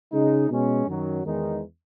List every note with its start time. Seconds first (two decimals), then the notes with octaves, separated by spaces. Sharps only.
0.12 C#3 G#3 D#4
0.49 B2 G#3 C#4
0.86 F#2 D#3 F#3
1.24 E2 D#3 G#3 D#4